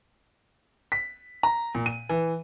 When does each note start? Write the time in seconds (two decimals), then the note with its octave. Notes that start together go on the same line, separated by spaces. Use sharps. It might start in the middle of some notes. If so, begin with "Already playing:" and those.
0.92 B6
1.43 A#5
1.75 A#2
1.86 D#7
2.09 E3